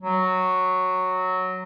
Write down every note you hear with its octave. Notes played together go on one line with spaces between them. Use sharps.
F#3